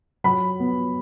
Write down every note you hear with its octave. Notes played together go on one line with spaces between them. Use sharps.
F#3 B5
B3